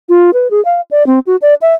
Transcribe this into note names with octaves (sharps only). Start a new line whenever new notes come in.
F4
B4
G#4
F5
D5
C4
F#4
D5
E5